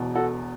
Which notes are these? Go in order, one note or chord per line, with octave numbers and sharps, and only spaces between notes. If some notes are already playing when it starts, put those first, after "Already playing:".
Already playing: E1 E2 B2
F#4 A4